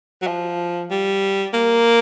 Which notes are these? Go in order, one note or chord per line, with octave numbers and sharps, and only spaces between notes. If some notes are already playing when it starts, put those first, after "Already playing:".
F#3
F3
G3
A#3